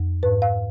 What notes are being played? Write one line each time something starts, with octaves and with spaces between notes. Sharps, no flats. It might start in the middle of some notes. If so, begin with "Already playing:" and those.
Already playing: F2
G#2 B4
F5